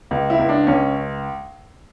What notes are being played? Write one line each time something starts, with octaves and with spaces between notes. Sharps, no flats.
C#2
E4
C#2
D4
C#2 C#4